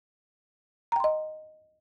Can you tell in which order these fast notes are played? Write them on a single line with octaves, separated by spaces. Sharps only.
A#5 G5 C6 D#5